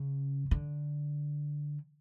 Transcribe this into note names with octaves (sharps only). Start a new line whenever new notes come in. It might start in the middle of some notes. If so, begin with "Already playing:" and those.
Already playing: C#3
D3